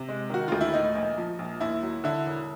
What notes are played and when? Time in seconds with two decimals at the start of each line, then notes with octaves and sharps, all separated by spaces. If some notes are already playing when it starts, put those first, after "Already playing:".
Already playing: C3
0.09 G#3
0.30 D#3 F#4
0.48 D2 F4
0.61 E4
0.74 A2 D#4
0.95 A#1
1.18 F3
1.39 A#1
1.60 D#2 E4
1.82 F#3
2.04 D3 E4
2.26 E1